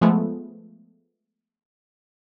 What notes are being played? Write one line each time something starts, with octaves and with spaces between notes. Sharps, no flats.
F3 G#3 A3 B3